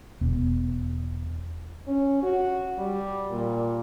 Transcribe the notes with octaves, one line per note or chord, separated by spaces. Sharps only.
E1 B3
C#4
F#4
G3
A#2